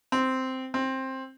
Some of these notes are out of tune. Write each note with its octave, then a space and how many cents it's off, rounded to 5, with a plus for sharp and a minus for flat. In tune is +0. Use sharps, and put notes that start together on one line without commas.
C4 -5
C4 +15